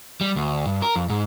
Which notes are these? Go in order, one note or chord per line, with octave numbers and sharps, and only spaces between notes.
G3
D2
G2
A#4
F2
G#2